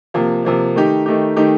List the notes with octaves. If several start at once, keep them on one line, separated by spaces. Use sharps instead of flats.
C3 F3 A#3
C3 F3 A#3
D#3 A3 D#4 G4
D#3 A3 D#4 G4
D#3 A3 D#4 G4